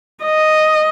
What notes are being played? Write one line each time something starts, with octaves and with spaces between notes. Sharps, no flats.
D#5